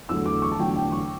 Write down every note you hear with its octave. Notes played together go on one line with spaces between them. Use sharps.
E2 D3 F#3 A3 E6
D6
C#6
A5
E2 D3 F#3 A3 G5
G5
C#6